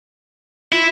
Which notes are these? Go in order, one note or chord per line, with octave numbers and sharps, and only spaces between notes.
E4 F4